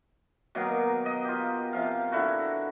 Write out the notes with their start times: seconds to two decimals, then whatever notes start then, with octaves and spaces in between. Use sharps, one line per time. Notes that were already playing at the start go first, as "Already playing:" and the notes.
0.55 B2 D#3 F#3 A#3
1.06 D#5
1.24 F4 G4
1.73 C3 F3 F5
2.12 D3 E4 F#4